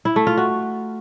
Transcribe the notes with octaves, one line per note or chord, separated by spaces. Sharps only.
E4
A3
F4
F#4